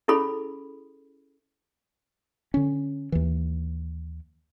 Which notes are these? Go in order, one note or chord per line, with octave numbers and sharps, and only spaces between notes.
C#4 E4 G#4 A4 B5
D3 C#4
D#2 E3